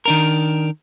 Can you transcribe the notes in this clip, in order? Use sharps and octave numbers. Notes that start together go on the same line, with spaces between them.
D#3 D4 A#4